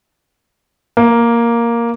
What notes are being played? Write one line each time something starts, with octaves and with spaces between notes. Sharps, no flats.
A#3